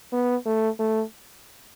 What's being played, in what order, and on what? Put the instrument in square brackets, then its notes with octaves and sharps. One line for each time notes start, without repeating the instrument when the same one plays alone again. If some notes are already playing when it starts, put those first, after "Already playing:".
[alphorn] B3
A3
A3